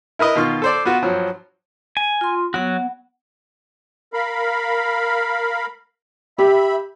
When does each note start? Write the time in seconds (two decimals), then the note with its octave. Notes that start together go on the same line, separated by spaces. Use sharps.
0.19 E4 A#4 B4 D#5
0.35 B2 D#3 F4 C#6 F6
0.62 A4 C5 D5
0.85 B3 F4 F#4
1.02 G2 F3 F#3
1.97 G#5
2.21 F4 C6
2.54 F#3 B3 F#4 F#5
4.13 A#4 F5 B5
6.38 G4 E5 B5